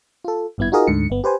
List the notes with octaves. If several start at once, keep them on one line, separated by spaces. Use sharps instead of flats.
F4 A4
G#1 G2 B3 E4 G#6
D#4 F4 F#4 G#4 A#4 D#5
D2 G#2 D3 C#7
G1 B3
G4 B4 C5 G#5